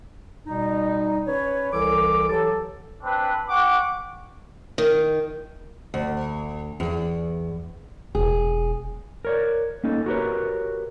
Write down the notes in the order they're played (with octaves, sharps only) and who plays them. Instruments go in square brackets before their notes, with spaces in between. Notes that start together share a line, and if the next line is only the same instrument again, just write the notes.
[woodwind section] B2 G3 D#4
C#4 B4 C#5
C2 E3 A4 D6
E3 F#3 G4 A4
[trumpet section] C4 D4 B4
G4 F#5 C#6 D6
[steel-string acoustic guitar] D#3
D2
E2
[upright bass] E1 [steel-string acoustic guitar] G#4
[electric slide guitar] A#4 C#5 D5
A#3 C#4 D#4 A4
F#4 G4 A#4 B4 C#5